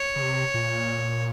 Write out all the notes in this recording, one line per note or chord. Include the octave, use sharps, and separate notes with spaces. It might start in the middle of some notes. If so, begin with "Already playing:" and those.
Already playing: C#5
C#3
C3
A#2